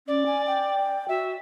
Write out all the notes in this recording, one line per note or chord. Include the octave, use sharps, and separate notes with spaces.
C#4 D5
G#5
G5
F#4 E5